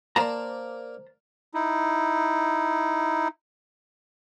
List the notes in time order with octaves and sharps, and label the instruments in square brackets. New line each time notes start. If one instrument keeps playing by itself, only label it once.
[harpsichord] A#3 D5 [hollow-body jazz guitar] C5 A5 A#5
[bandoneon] D#4 E4